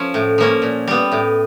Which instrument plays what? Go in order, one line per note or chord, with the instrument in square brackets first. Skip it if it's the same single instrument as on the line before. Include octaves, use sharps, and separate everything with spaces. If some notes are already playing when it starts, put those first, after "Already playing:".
Already playing: [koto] F3 C#4
A2
F3 A#3 C#4
A#2
G3 B3
A2